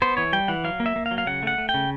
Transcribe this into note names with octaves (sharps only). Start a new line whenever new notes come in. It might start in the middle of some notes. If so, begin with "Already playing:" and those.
B3 C5
E3 C#5
G3 G5
E3 F#5
F#3 F5
A#3
E5
A#3
F5
F#3
F5
C#3 F#5
A3 F#5
A3
G5
C#3